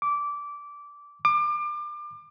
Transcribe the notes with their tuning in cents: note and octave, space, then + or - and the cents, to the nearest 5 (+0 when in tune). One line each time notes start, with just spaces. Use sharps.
D6 -15
D6 +30